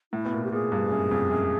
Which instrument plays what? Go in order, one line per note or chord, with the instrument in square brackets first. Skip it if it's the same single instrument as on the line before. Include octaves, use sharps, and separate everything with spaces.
[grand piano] A2 [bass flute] E4
[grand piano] B2
A#2
[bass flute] G4
[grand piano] A#2 [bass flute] G#4
[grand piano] G2
F#2
F2
F#2